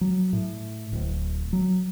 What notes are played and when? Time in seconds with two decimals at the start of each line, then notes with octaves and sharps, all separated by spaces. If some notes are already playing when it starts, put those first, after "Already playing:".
0.01 F#3
0.33 A2
0.93 D1
1.53 F#3